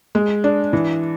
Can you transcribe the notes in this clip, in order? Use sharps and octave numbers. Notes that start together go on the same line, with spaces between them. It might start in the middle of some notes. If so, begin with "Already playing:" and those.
G#3
D4
E3